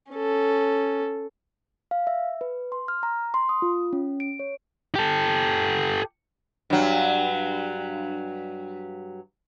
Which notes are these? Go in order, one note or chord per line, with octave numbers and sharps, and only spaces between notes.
C#4 A4
F5
E5
B4
C6
F6
A#5
C6
D#6
F4
C#4
D7
C#5
G4 A4
G2 F#3